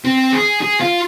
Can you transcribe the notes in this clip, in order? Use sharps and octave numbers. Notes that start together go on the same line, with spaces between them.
C4
G#4
G#4
F4